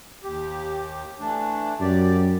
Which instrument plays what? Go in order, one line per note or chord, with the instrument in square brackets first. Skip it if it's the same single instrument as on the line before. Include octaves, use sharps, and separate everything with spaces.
[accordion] D#2 G4
E3 A3 D4
[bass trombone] F#2 [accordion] G4 D5